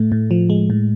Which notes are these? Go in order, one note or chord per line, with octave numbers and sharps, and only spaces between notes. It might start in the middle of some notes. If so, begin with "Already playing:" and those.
Already playing: A2 A3
A2
F3
G#3
A2